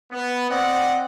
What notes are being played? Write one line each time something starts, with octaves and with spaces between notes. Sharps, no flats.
B3
C4 D5 D#5 F#5